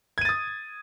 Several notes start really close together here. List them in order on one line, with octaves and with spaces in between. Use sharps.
G#6 D#7 A6 D#6